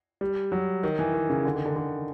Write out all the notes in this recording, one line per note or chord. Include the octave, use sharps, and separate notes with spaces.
G3
F#3
D#3
E3
D#3
C#3
D3
D#3
D3
D3